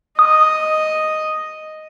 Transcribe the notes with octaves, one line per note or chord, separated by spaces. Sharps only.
D#5 D#6